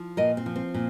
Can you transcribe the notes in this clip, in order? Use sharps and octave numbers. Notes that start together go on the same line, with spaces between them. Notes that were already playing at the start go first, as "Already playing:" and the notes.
Already playing: F3
A#2 A#4 D#5
C4
F3
C4
A#2